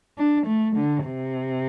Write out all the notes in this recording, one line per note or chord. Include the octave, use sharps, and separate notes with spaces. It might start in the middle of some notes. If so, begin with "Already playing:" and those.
D4
A3
D3
C3